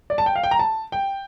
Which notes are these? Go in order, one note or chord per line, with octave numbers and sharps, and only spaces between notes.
D5
A5
G5
F5
G5
A#5
A5
G5